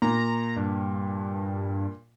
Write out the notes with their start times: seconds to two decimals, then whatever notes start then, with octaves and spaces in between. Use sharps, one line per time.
0.02 A#2 A#5
0.57 G2